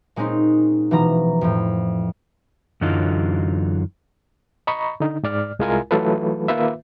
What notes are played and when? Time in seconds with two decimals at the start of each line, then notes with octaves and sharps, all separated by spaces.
0.16 A#2 G#3 C4 C#4 D#4 C6
0.91 B2 E3 F3 A#5
1.41 F2 A2
2.81 F#2 D3 E3 F#3 D#4 F4
4.67 D#5 A#5 B5 C#6
5.00 D3 D#4
5.23 G#2 D5 F6
5.59 C2 G#3 E4 F4 A#4 G#5
5.91 E3 F#3 A3 F4 A4 B4
6.48 D#3 A#3 F4 B4 E5